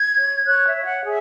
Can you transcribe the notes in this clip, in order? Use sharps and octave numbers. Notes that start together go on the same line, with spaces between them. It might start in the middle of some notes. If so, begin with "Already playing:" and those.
Already playing: G#6
C#5
C#5 F#6
E5
C#5
F#5
G#4 E5